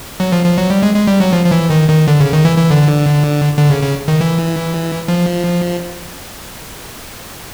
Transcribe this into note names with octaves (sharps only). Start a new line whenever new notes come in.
F#3
F3
F3
F#3
G3
G#3
G#3
G3
F#3
F3
F3
E3
D#3
D#3
D3
C#3
D#3
E3
E3
D3
D3
C#3
C#3
D#3
E3
F3